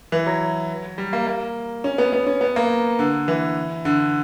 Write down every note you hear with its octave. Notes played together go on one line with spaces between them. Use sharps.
E3
F#3
G3
A#3
A#3
C#4
B3
B3
C#4
B3
A#3
D3
E3
D3